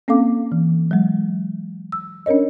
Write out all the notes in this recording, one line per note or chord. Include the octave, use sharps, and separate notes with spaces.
A#3 C4 C#4 A4 F5 D6
E3
F#3 G#3
E6
C#4 D4 A#4 C#5 D#5